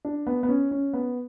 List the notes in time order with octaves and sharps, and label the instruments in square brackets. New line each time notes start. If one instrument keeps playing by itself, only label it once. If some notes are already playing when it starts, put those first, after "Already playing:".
[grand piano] D4
B3
B3
C#4
C#4
B3